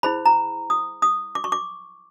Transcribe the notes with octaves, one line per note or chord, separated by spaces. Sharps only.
E4 G#4 C5 B5
A#5
D#6
D#6
D6
C#6
D6